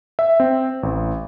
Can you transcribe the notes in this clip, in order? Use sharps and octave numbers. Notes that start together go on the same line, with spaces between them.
E5
C4
A1